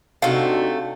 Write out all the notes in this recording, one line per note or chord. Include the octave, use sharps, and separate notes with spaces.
C3 A3 D4 D#4 F#4 F5